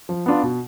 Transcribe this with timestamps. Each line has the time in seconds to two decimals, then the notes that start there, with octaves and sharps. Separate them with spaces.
0.09 F3
0.26 B3 D4 F4
0.43 B2